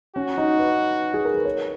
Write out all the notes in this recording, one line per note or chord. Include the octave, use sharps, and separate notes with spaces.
C#4 F#4
D#4
B4
G#4
A#4
B4
C#5